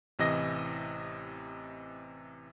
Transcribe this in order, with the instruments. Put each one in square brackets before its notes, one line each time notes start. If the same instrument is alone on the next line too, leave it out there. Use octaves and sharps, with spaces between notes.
[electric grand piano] A1 C3 E3 D#5 A#6